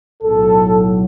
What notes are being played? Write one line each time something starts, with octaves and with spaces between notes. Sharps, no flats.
B1 A2 F#3 A4